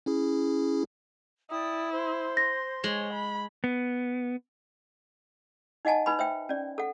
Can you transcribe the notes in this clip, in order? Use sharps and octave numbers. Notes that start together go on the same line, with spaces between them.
C#4 E4 G#4
E4 D5 G5 D#6
C5 C6
A#6
G#3 C#5
B5
B3
D#4 D#5 F#5 G#5 A5
D#4 B4 G#5 B5
C5 E5 G5
C#4 D5
A4 F#5